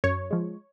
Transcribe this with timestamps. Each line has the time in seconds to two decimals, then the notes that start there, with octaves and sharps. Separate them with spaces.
0.04 F#2 C#5
0.31 F3 G#3